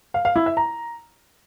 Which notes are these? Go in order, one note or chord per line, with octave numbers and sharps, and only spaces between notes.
F5
F5
E4
E5
A#5